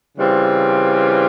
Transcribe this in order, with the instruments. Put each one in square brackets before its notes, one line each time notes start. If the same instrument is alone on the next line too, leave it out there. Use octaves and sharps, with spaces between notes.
[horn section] C#3 E3 G3 C4 F4